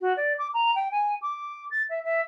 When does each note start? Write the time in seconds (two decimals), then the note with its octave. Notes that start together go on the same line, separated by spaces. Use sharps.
0.01 F#4
0.17 D5
0.38 D6
0.54 A#5
0.75 G5
0.91 G#5
1.22 D6
1.71 A6
1.90 E5
2.04 E5